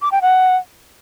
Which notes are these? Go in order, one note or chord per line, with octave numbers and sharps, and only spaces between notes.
D6
G5
F#5